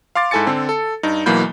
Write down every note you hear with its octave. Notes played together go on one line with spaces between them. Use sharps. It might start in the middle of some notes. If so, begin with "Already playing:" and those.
F5 C6 D6 A6
G#2 E4 A4 G#5 A6 C#7
D3 C4 A4
A4
G2 D#4
B1 E3 F#3 A#3 B5 G6